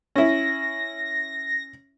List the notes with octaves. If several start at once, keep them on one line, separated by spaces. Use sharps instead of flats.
C#4 E4 A#6